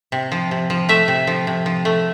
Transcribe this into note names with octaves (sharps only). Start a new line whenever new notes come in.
C3
F3
C3
F3
A3 E5
C3
F3
C3
F3
A3